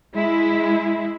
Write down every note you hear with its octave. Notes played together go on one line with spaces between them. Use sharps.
G#3 E4